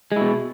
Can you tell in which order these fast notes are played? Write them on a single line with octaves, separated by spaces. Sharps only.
G#3 E4 B2